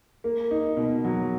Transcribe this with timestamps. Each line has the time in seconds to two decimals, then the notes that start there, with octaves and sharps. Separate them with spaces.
0.24 A#3
0.51 D#4
0.77 B2
1.05 F#3